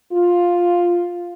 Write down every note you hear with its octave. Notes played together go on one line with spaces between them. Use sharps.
F4